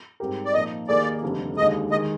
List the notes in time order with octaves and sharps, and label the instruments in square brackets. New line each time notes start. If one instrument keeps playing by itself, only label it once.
[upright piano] G#2 G3 C4 G4 A#4
[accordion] D5
[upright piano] A#2 F3 A#3 D#4 [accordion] D#5
[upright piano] D#2 D#3 A#3 D#4 G#4 [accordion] D5
[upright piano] F1 F2 D3 G3
[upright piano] D#2 D3 G#3 [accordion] D#5
[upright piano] D#3 G#3 [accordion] D#5